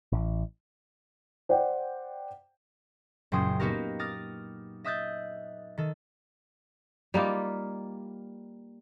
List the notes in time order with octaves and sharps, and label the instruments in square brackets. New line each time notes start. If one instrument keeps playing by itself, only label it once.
[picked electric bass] A1
[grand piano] C5 D5 F#5 G5
[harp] F#1 A#2 F#3 G5 C6 D#6
A#3 B3 D#4 F#4 G4 A#4
D6 D#6 F6 A6 A#6
D#5 E5 D#6 F#6 G6 A6
D#3 A4
[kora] G3 A#3 D#4 F4